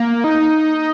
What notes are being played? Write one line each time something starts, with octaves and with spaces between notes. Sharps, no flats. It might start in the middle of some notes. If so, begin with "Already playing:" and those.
Already playing: A#3
D#4